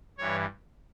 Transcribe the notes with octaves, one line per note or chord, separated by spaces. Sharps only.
G2 E3 C#5